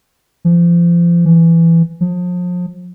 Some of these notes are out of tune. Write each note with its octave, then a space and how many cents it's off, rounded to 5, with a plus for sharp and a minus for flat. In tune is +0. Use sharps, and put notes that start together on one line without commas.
F3 -30
E3 +15
F3 +35